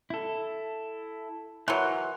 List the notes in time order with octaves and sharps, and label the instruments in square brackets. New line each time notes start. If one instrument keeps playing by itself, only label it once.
[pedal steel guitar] E4 A4
[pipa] E3 F#3 [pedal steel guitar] A#4 C6 F#6